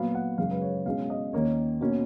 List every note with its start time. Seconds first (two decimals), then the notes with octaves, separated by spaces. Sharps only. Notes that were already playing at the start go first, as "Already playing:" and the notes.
Already playing: A#2 F#3 B3 F5
0.15 F#5
0.38 F#2 C#3 G#3 F5
0.51 B4
0.62 C#5
0.86 B2 G#3 C#4 F5
1.10 D#5
1.33 D#2 D#3 A#3 C#4 C#5
1.81 B2 A#3 C#4